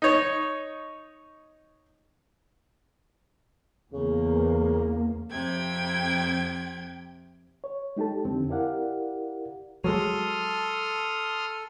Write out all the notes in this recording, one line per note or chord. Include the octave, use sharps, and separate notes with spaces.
D#4 C#5
E2 C#3 A#3
F2 C3 G5 G#6
C#5
G#3 D#4 G4 A4 A5
F2 D3 C4
E4 G4 A#4 D5 F5 F#5
F#3 G#3 A4 C6 D#6 F6